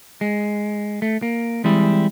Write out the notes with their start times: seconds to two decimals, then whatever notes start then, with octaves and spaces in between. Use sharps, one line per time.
0.21 G#3
1.02 A3
1.22 A#3
1.64 E3 G3 G#3 C4 E4